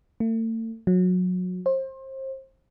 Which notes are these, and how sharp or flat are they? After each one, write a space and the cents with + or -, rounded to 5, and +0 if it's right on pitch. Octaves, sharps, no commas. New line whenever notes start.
A3 +40
F#3 -25
C5 +30